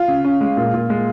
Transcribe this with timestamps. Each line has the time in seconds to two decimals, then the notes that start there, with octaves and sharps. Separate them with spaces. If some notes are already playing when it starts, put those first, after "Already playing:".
Already playing: F4
0.08 C#3
0.25 C#4
0.41 G#3
0.57 A#2
0.74 A#2
0.90 G#3